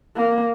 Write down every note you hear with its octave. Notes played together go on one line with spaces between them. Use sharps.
A#3